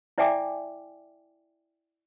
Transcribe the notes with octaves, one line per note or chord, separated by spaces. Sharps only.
E4 D5 E5 G5 G#5 D6